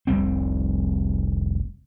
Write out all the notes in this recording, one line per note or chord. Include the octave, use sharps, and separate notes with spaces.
F1 C2 G3 C4